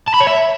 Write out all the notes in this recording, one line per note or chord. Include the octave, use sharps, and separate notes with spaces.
A5
B5
C#5
E5